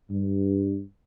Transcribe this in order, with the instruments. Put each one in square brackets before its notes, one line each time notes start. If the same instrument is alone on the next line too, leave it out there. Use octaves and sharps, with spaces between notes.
[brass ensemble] G2